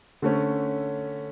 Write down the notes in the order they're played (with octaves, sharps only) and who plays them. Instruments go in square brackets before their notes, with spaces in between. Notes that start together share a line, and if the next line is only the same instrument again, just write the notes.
[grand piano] D3 A3 C#4